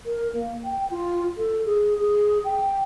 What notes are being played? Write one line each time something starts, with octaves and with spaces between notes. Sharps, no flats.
A#4
A#3
G5
F4
A4
G#4
G#4
G5